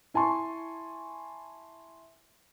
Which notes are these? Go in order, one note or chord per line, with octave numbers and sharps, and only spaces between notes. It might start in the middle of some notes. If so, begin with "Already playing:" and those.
E4 G#5 A5 C6 C#6